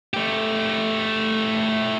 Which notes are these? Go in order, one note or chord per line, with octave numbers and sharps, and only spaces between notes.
A3 G4